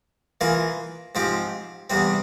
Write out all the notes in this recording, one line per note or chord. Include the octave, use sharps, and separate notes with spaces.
E3 A#3 F4 G#4
G#2 F3 C4 G4
E2 C3 G3 C4